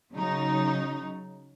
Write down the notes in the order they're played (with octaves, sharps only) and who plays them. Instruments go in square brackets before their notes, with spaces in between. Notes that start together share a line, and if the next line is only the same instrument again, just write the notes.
[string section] C#3 F#3 D#4